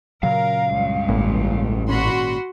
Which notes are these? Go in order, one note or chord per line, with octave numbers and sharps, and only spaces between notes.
A#2 C#3 F#3 A#4 F5
C#2 G2
A1 G#3 A#3
G#1 A#2 C#4 F#4 B5 C6